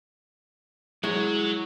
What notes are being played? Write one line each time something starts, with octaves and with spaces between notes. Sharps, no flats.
G#3 E4 F#4 C#5